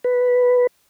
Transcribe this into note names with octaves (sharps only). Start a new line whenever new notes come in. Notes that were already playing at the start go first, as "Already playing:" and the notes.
B4